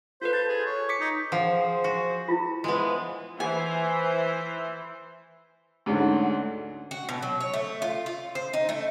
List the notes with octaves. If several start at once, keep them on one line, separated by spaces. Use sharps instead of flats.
F4 A4 B4 C5
A5 G6 G#6
G#4
C#5
D6 B6 C#7
D#4
F3 G#4 C5 F#5
F#4
E4 F4
E3 F3 G#3 B3
E3 C5 G#5
D2 G#2 D3 C#4
F#4
B2
F#3
C#5
A3
F4
F4
C5
D#4
A3